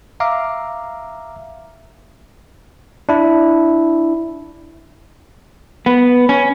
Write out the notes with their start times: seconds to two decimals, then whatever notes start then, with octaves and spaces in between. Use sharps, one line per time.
0.20 E5 F5 A#5 D6
3.09 D4 E4
5.86 B3
6.29 C#4